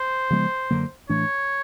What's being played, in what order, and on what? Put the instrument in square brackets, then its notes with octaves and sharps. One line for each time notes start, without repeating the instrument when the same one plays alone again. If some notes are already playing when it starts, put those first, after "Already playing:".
Already playing: [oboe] C5
[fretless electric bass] C#3 F3 G#3 B3
F#2 D3 F#3 A#3
[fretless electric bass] A2 E3 A3 D4 [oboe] C#5